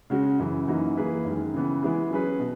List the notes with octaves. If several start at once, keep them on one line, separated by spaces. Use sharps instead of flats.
C#3 G#3 C#4 F#4
F#2 C#3 E3
F#2 E3 A#3 D#4 F#4
E3 A#3 E4 G#4 B4
F#2 D#3 G#3
C#3 E3 B3
E3 G#3 B3 E4 G#4
F#3 C#4 G#4 B4
B2